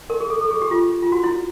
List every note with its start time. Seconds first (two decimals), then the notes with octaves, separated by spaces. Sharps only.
0.10 A#4
0.20 G#4
0.30 A4
0.41 A4
0.51 G#4
0.62 G4
0.71 F4
1.02 F4
1.12 F#4
1.24 E4